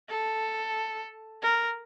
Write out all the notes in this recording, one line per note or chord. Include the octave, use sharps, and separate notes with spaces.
A4
A#4